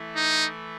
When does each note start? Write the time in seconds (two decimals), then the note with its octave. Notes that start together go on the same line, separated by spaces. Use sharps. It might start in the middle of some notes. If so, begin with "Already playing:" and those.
Already playing: E3 A3 E4
0.16 D#4